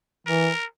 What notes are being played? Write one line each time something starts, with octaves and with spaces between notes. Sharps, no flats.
E3 A#4